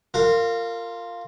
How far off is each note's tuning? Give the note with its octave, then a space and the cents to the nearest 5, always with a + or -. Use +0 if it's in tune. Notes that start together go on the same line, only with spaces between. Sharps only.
F4 +0 A#4 -25